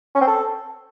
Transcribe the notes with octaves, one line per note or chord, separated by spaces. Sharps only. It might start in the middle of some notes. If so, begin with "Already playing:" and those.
C#4
C4
A4